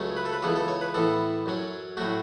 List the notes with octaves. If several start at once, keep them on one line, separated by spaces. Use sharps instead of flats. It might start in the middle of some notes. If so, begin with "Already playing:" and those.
Already playing: C#2 C#3 F#3 A3 C#4
B4
A4
B4
C#2 C#3 E3 B3 A4
A4
C#5
B4
A2 E3 B3 A4
F#2 F#3 C#4
A2 F#3 A3 F#4